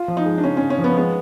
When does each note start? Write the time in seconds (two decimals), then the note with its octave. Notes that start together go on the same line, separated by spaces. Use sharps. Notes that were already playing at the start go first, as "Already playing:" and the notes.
Already playing: F4
0.08 F3
0.17 D#4
0.26 G#3
0.38 D4
0.43 C#3 C#4
0.57 C#4
0.61 C#3
0.70 C#4
0.78 F3
0.84 B3
0.96 G#3 B3